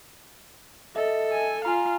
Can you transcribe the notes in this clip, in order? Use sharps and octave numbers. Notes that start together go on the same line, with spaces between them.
A4 D#5 E5
G#5
F4 F5 G#5 A#5